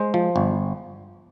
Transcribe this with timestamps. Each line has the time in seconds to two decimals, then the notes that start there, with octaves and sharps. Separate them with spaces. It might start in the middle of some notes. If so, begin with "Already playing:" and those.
Already playing: G#3 C5
0.14 F3
0.36 G1